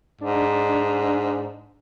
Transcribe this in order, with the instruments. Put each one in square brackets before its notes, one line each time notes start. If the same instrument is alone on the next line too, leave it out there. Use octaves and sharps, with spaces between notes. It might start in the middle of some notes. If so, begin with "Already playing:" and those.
[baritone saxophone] G#2 [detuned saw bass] D4